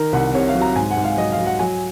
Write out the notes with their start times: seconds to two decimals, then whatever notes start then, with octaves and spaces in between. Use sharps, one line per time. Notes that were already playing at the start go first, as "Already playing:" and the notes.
Already playing: D#3 A#4
0.13 C2 F#5
0.34 C3 C#5
0.48 F5
0.55 F#3
0.61 A#5
0.76 G#2 G#5
0.91 F#5
0.97 G#2
1.04 F5
1.17 F#3 D#5
1.32 F5
1.38 F#3
1.46 F#5
1.59 F#3 G#5